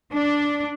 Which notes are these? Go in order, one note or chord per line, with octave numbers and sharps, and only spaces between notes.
D4